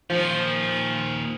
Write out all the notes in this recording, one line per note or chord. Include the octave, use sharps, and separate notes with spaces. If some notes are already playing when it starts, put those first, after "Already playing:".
A#2 D#3 F3